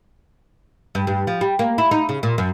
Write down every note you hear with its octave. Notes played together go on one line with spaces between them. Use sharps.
G2
G2
F3
G3
A#3
E4
D#4
C#3
A#2
F#2